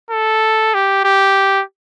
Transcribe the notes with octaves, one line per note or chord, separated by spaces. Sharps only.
A4
G4
G4